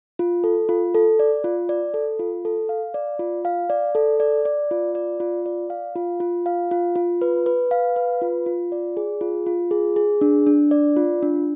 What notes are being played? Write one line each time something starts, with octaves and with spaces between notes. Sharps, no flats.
F4
A4
F4
A4
D5
F4
D5
A4
F4
A4
F5
D5
F4
F5
D5
A4
D5
D5
F4
D5
F4
D5
F5
F4
F4
F5
F4
F4
B4
B4
F5
B4
F4
F4
D5
G#4
F4
F4
G#4
G#4
D4
D4
D5
F4
D4